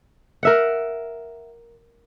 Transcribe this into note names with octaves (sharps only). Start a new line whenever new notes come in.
A#4 E5 F#5